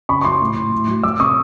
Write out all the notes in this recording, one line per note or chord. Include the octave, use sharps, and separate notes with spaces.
C#3 B5 C#6
C#6
F#3 C6 D6
A2
A2
A2
F#3
F#3 D6 E6
C3 C#6 D#6